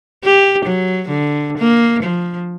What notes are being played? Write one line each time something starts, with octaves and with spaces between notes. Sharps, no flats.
G4
F#3
D3
A#3
F3